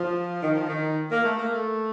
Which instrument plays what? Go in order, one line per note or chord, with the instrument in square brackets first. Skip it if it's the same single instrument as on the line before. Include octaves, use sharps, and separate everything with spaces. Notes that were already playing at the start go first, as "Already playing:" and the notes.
Already playing: [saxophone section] F3
D#3
F3
D#3
A#3
A3
A#3
A3